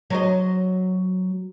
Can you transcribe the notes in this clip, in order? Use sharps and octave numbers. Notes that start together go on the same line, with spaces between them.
F#3 C5 D#5